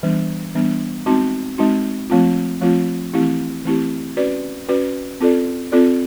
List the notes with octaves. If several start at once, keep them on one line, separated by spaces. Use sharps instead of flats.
E3 G3 B3 D4
E3 G3 B3 D4
G#3 C4 D#4 F#4
G#3 C4 D#4 F#4
F3 A3 C4 F4
F3 A3 C4 F4
E3 A3 C4 E4 G4
E3 A3 C4 E4 G4
C#4 F#4 B4 D5
C#4 F#4 B4 D5
C4 F4 A4 D5
C4 F4 A4 D5